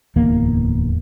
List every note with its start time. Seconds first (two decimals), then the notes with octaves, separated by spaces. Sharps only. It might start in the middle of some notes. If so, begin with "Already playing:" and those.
0.16 D1 E2 A#3